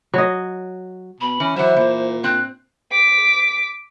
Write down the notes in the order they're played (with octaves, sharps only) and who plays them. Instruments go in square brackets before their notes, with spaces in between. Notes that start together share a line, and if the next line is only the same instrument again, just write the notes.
[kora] F#3 D#5
[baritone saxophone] B2 [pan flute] B5
[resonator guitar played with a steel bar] E3 [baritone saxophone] C#4
[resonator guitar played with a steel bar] E3 E5 [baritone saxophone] F#3 [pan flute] C5
[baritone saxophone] A#2 [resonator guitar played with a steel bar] E3
[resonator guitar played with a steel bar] C4 [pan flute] F#6
[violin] D6 B6